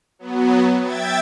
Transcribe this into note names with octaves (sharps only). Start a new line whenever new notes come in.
F#3 B3
E5 G5 G#6 A6